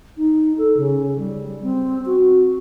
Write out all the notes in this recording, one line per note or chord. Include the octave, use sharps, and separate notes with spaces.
D#4
A4
C#3
G3
G3
C4
F#4